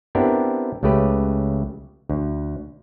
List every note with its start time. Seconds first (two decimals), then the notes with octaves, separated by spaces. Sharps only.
0.15 B3 C4 D4 E4 G4 A#4
0.83 C#2 C#3 A3 G4 B4
2.10 D2